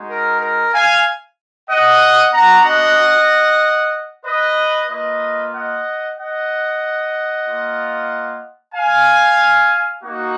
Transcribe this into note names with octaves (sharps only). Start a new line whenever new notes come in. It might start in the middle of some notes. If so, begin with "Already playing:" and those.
Already playing: G#3 D#4 F#4
A#4
A#4
F5 G#5
D#5 F#5
B3 D4 F#4 F#5 A#5
D#5 F#5
B4 D#5
A#3 F4 B4 D#5
D#5 F#5
D#5 F#5
A#3 F4
F5 G#5
A#3 D#4 F#4